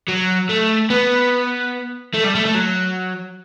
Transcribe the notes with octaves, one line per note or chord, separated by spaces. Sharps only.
F#3
A3
B3
A3
G3
A3
A3
F#3